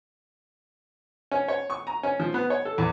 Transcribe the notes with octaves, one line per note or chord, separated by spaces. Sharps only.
C#4
C#5
C#6
A#5
C#4
F3
B3
C#5
A4
E2